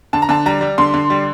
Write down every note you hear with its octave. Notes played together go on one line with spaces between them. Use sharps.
D3 A5
A#5
D3 A5
G3 A#5
G3
D3 C6
D3
G3